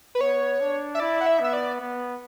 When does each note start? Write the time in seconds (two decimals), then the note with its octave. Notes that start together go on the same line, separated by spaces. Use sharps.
0.15 B4
0.20 B3 C#5
0.60 D4
0.95 E5
1.00 E4 D5
1.21 F#5
1.26 E5
1.40 B3 E5
1.53 D5
1.80 B3